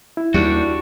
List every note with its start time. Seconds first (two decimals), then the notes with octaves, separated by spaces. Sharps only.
0.17 E4
0.34 D#2 G3 D4 F#4